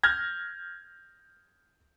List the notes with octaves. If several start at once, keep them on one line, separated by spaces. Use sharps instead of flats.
F6 G6 G#6 A#6